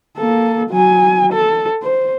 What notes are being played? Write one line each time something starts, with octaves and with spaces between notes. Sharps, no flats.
A#3 A4
F#3 G#5
A4
C5